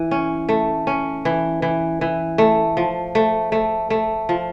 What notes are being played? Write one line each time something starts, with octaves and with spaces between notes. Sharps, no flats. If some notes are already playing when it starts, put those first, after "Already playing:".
Already playing: E3
C#4
A3
C#4
E3
E3
E3
A3
F3
A3
A3
A3
F3